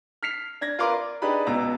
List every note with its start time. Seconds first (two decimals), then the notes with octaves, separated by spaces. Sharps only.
0.23 F6 B6 C7 F7
0.61 D4 G#6 A#6
0.79 F4 A#4 B4 F5 C6 D6
0.93 D5
1.22 D4 D#4 G4 G#4 B4 B5
1.47 C#2 B2 B3 A#5 E6